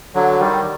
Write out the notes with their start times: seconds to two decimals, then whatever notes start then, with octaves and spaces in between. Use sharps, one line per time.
0.15 D3 F#3
0.40 D#3 G3